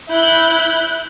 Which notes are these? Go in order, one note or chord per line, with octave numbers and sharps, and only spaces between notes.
E4 F#6 G6